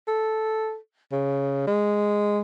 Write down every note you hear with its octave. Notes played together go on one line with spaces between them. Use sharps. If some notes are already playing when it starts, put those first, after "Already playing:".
A4
C#3
G#3